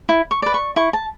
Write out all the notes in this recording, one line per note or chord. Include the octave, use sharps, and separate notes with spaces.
E4
C#6
B4 D5
C#6
E4 C#6
A5